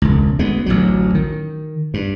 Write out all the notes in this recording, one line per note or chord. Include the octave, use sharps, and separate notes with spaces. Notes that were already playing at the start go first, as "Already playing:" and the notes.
E1 C#2
D2 G#3 B3
A1 D2 F#3
D#3
G2